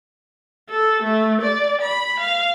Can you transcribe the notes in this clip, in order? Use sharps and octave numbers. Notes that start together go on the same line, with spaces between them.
A4
A3
D5
B5
F5